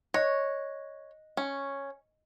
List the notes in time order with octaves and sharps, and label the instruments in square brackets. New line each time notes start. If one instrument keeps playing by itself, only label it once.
[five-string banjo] C#5 [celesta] D#5 F#6 A#6
[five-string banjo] C#4